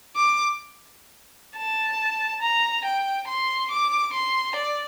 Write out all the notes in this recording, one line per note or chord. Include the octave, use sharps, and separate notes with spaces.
D6
A5
A#5
G5
C6
D6
C6
D5